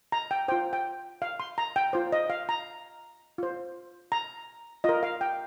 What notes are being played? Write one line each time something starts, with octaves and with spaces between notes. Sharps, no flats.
A#5
G5
F4 C5 G5
G5
F5
C6
A#5
G5
F4 C5
D#5
F5
A#5
F4 C5
A#5
F4 A#4 D#5
F5
G5